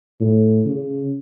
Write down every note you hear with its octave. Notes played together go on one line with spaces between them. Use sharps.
A2
C#3